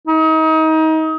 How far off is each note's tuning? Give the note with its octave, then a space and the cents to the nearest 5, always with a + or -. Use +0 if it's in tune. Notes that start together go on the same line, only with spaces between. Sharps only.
D#4 +30